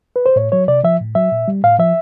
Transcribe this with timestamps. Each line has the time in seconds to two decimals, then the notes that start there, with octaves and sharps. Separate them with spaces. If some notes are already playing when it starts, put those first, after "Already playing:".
0.16 B4
0.26 C5
0.36 A2 C#5
0.52 F#3 C#5
0.68 C3 D5
0.84 F3 E5
1.00 A2
1.15 F#3 E5
1.32 A#2
1.48 G3
1.64 A2 F5
1.79 F3 E5